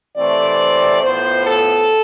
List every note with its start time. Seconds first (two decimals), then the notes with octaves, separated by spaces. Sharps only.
0.16 C3 E3 A3 C4 D5
1.02 A2 F3 B3 C5
1.46 A4